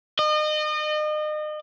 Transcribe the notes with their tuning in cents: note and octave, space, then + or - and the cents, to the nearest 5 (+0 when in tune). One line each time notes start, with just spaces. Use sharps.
D#5 -35